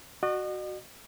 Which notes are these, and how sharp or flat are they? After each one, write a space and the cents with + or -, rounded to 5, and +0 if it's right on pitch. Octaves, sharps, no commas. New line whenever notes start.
F#4 +0 D#5 -45